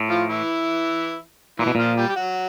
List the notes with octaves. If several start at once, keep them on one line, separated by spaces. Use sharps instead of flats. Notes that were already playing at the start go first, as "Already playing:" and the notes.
Already playing: A2
F3 F4
E3 E4
A#2 E3 E4
B2
A#2 F3 F4
G3 G4
G4
F#3 F#4